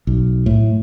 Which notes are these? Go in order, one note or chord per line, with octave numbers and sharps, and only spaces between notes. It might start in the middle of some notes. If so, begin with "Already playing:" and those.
B1
A2